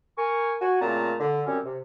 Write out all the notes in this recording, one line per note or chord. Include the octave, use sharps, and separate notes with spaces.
A#4 G#5 C#6
F#4 G#5
A#2 C#3 A3 C4 A5 A#5
D3
F#2 G3 C4 C#4
C3